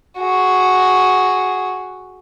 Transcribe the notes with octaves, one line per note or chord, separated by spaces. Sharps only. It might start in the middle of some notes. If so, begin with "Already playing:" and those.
F#4 G#4